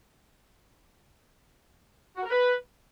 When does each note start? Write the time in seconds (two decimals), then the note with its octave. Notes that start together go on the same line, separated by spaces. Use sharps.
2.16 F#4
2.23 A#4
2.30 B4